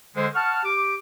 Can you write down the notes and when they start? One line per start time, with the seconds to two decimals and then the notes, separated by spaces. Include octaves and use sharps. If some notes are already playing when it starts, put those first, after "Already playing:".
0.16 D3 G#3 C5
0.34 F#5 A5 C#6 F6
0.64 G4 D6